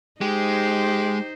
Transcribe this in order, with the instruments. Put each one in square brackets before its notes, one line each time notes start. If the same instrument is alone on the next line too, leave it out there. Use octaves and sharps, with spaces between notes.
[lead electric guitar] G#3 [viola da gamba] D#4 C5 [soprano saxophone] G4